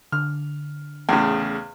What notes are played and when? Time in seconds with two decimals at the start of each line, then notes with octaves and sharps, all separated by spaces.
0.12 D3 F6
1.09 E2 A2 C#3